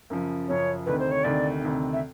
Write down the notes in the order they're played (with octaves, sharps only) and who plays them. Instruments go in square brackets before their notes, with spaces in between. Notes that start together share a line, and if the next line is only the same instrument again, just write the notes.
[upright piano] F#2 C#3 F3
[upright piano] F#2 C#3 F3 [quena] C#5
[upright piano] D2 C3 D#3 [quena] B4
[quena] C5
C#5
[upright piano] D2 C3 D#3 [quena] D5
[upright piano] D2 C3 D#3
[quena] E5